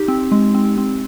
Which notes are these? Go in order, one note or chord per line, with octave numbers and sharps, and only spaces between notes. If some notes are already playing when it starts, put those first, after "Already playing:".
Already playing: D#4 G4
C4
G#3
C4
C4